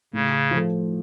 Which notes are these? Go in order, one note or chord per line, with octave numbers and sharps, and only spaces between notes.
A2 C#3
F3 A3